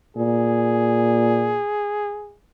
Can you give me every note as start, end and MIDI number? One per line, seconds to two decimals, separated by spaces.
0.17 1.60 46
0.17 2.36 68